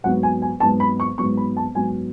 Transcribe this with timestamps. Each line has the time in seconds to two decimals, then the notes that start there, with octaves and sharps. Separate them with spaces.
0.04 G#2 F#3 B3 F#5
0.23 G#5
0.42 G#5
0.60 G#2 F#3 B3 A5
0.80 B5
1.00 C#6
1.18 G#2 F#3 B3 C#6
1.37 B5
1.57 A5
1.75 G#2 F#3 B3 G#5